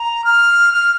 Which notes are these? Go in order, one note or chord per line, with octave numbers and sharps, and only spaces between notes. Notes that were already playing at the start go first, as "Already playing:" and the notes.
Already playing: A#5
F6
F6